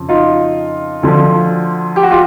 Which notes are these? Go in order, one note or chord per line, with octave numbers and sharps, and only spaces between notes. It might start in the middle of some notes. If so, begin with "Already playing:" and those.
Already playing: F2 C#3 F3
D#4 F4
D2 D3 F3
G4
F#4
F4 G4